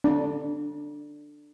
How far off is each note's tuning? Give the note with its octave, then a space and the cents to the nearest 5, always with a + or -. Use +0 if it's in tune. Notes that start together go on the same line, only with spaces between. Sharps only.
D4 +10